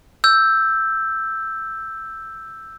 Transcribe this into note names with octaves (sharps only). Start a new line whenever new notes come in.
E6 G6